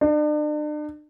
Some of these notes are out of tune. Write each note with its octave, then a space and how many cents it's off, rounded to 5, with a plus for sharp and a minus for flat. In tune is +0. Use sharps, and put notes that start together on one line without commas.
D4 +40